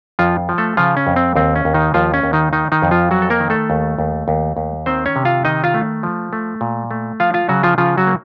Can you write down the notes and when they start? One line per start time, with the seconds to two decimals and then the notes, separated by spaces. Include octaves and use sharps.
0.19 F2 F3 F4
0.49 F3
0.58 A3 A4
0.77 C#3 F3 F4
0.97 C#4
1.07 F2
1.16 C4
1.36 D#2 C4
1.56 C#4
1.65 D#2
1.74 D#3 D#4
1.94 D#2 F3 F4
2.14 C#4
2.23 D#2
2.33 D#3 D#4
2.53 D#3 D#4
2.72 D#3 D#4
2.82 F2
2.91 F3 F4
3.11 F#3 F#4
3.22 A4
3.30 A#3 A#4
3.40 D#3
3.50 A3 A4
3.70 D#2
3.99 D#2
4.28 D#2
4.57 D#2
4.86 D#3 C4 C5
5.06 C#4 C#5
5.16 C3
5.25 F4 F5
5.45 D#3 D#4 D#5
5.64 F4 F5
5.74 A3
6.03 F3
6.33 A3
6.61 A#2
6.91 A3
7.20 F3 F4 F5
7.34 F4 F5
7.49 C#3 F#3 F#4
7.63 F3 F4
7.78 C#3 F3 F4
7.97 F#3 F#4
8.07 A#3